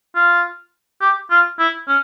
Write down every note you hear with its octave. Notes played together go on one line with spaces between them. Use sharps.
F4
G4
F4
E4
C#4